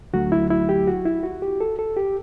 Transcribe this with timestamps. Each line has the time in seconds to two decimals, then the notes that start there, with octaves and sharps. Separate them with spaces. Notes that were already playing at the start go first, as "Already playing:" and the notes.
0.13 D2 D3 F#3 A3 F#4
0.32 E4
0.50 E4
0.69 G4
0.87 F#4
1.05 E4
1.23 F#4
1.42 G4
1.61 A4
1.79 A4
1.96 G4